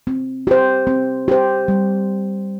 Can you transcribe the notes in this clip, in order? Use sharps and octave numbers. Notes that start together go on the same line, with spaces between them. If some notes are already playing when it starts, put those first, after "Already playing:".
C4
G4 C5
C4
G4 C5
G3